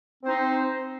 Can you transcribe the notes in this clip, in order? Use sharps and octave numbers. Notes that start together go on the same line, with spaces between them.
C4 D#4 C5